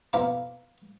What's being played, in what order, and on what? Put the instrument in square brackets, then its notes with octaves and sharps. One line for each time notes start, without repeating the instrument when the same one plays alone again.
[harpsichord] F2 B2 E4 F5 A#5 D6